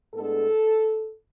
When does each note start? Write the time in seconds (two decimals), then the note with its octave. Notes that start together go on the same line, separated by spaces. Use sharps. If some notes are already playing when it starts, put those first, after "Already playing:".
0.14 A2 G#3 B3 D4 A4